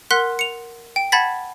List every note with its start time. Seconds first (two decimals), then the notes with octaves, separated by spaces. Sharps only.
0.11 A#4 F#5 C6 F#6 B6 G7
0.39 C#7 F7
0.96 G5
1.12 F#5 A5 B5 G#6 A6 B6